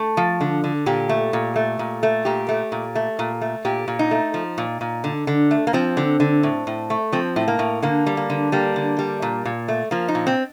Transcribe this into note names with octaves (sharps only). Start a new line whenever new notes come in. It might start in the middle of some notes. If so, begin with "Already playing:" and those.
Already playing: A3 A4
F3
D3
D3
A#2 G4
A3
A#2
A3
A#2
A3
A#2 G4
A3
A#2
A3
A#2
A3
A#2 G4
A#2
D#4
A3
F3
A#2
A#2
D3
D3
A3
A#3
F3 C4
D3
D3
A2
A2
A3
F3 C4
A2
A#3
A2
D3 A#3
G3
A#3
D3
G3 A#3
D3
G3
A#2
A#2
A3
F3 A#3
D#4
A#2
C4